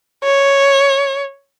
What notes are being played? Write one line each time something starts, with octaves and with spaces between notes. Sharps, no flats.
C#5